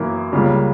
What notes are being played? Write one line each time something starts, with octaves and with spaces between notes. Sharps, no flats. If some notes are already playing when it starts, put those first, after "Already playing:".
Already playing: F#2 E3 A#3
C#2 C#3 G3 A#3